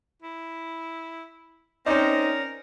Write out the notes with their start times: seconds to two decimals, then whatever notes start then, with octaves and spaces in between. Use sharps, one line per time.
0.22 E4
1.86 C4 C#4 D#4 A#4 D5